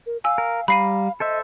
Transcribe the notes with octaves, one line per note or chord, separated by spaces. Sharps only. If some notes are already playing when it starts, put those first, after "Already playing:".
A#4
F5 G#5 E6
A#4
G3 F5 A#5 B5 C7 D#7
A4 C5 D#5 E5